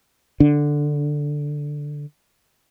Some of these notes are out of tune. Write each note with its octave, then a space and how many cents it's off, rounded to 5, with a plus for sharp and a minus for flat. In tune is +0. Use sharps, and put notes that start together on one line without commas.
D3 +0 D4 +0